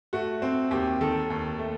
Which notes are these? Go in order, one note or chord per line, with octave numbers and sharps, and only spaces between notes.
A3 F#4
C4
D#2 G4
D#3 A4
D#2
A3